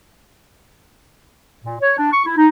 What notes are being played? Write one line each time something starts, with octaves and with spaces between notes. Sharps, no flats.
A#2
C#5
D4
C#6
E4
D#4